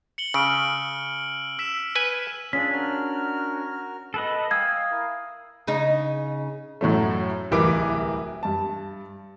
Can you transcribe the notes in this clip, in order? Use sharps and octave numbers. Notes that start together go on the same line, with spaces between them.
C#7 F#7 G7
C#3 E6 F6 D7
E6 B6 E7
B4 G#5
C#4 D4 F4 G#4 E6 B6
F#4 A#4 F6
B3 A4 B4 D#5
F5 G5 G#5 D#6 E6 G#6
E4 A#4
C#3 D#4
F#2 A2 F#3 A3
D1 C2 E3 A#4 B4 D6
G2 A5